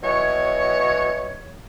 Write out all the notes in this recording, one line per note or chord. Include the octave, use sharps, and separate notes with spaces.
B2 E3 F#3 C#5